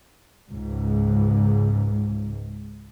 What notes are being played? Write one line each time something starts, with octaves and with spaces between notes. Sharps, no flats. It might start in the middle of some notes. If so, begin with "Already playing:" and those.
C#2 G#2